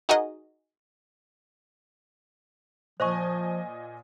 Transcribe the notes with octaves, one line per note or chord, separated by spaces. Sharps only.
D#4 F#4 G#4 A#4 D#5
A#2 F3 C5 D#5 G#5 C#6